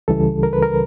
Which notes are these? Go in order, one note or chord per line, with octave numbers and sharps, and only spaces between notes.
C#2 C#3 E3 G3 A4
A#4
B4
A#4